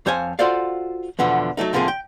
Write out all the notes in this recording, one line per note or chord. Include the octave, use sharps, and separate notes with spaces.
F2 C5 C#5 F5 G#5
F4 F#4 A4 C5 D5 F5
E2 B2 D3 F3 B3
F#3 G3 A3 D#4
A2 D3 F3 A#3 C4 G#4
G5